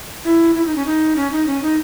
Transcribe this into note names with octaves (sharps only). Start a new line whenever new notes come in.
E4
E4
D#4
C#4
D#4
C#4
D#4
C#4
D#4